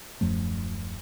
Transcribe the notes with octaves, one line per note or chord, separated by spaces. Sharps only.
D#1 F#2 F3 A3